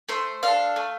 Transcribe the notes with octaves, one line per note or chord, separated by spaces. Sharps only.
A3 C5
D4 A4 F5
A3